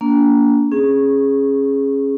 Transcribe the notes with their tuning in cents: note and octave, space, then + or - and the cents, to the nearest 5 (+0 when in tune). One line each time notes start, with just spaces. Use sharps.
A#3 +0 D4 -35
C#4 -20 G#4 +0